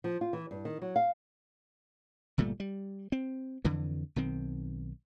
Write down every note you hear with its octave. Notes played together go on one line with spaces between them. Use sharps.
F3
F4
E3
G2
D#3
F#3
F5
G1 A#2 G3 A3
G3
C4
F2 D3 E3
B1 D#3 C4